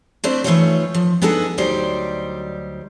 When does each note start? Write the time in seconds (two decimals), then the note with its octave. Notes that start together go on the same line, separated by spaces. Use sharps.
0.24 A3 C4 D4 E4 C5 D5
0.44 E3 A3 D#4 F4 C5 C#5
0.94 F3
1.22 B3 D4 D#4 G#4 A4 F#5
1.58 D2 F#3 G3 D#4 C5 D5